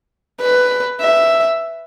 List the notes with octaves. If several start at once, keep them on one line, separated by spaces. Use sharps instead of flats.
B4
E5